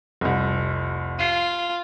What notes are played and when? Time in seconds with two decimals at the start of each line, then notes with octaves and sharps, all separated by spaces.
0.21 F1 C2
1.19 F4 C7 D#7